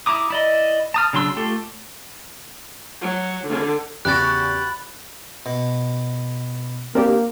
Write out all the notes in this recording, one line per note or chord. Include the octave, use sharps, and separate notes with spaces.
E4 A#5 D6 D#6
E4 D5 D#5
A5 D#6 F6
C#3 F#3 D4 C6 E6
A3 F4 G4 A4
F#3
D3
E2 C#3 F#4 G4 B5 F#6 A6
B2
A#3 C4 D4 G4 A#4